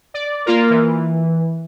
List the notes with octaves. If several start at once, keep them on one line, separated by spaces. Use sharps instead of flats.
D5
A#3 F4 A#4
E3